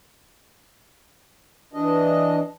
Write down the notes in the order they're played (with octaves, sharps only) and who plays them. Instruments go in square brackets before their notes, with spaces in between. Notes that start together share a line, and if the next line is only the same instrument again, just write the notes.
[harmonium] E3 D4 D#5